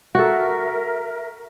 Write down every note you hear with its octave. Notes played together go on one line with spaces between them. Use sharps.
F#4 A4 A#4 E5